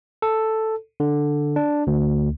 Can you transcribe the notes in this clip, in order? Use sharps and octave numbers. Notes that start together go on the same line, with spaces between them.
A4
D3
D4
D2